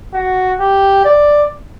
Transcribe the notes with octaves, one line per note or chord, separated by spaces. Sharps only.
F#4
G4
D5